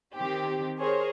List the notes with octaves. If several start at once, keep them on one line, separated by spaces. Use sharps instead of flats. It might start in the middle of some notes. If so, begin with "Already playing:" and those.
D#3 C4 G4
G#4 A#4 C5 C#5